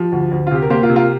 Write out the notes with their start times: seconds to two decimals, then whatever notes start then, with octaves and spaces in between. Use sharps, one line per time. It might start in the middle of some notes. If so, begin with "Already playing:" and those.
Already playing: F3 G4
0.12 D2
0.31 D2
0.47 F4
0.51 C3 G4
0.62 A#4
0.70 A#3 G4 C5
0.83 F4 A#4
0.89 C3
0.96 F4 A#4